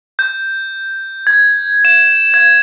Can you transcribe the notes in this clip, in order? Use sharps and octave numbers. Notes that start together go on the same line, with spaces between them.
G6
G#6
E7
G#6